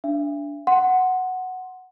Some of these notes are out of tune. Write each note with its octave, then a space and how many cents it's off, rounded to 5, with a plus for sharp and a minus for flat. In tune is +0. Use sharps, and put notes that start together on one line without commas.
D4 -15 E5 +40
F#5 +0 C6 +0